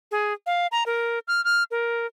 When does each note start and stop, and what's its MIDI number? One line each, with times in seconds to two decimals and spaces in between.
0.11 0.33 68
0.46 0.67 77
0.72 0.84 82
0.86 1.19 70
1.28 1.43 89
1.44 1.63 89
1.71 2.06 70